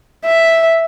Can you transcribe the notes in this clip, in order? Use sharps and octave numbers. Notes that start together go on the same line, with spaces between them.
E5